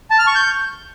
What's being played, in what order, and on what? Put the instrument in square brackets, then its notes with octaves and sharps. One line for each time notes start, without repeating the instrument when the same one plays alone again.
[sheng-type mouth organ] A5
F6
C#6
G6